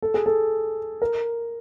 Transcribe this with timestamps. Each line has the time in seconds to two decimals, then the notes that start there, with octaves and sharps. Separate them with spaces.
0.02 A4
0.14 G#4
0.26 A4
1.02 A#4